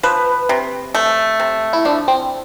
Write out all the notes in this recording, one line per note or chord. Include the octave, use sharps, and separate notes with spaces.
F3 B4
C3
A3
C3
E4
F3 D4
C4